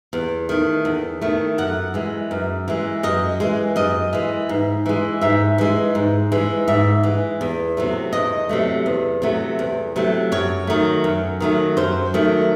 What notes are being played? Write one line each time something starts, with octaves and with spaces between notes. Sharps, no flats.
E2
D#3 A3
E2
D#3 A3
F#2 F#5
E3 G#3
F#2
E3 G#3
F#2 D#5
E3 G#3
F#2 D#5
E3 G#3
G#2
E3 G#3
G#2 E5
E3 G#3
G#2
E3 G#3
G#2 E5
E3 G#3
E2
C3 F#3 A3
E2 D#5
C3 F#3 A3
E2
C3 F#3 A3
E2
C3 F#3 A3
F#2 C#5
D#3 F#3 A3
F#2
D#3 F#3 A3
F#2 C5
D#3 F#3 A3